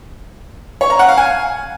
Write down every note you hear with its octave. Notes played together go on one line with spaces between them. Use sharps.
C#5
A#5
F#5
F5
G#5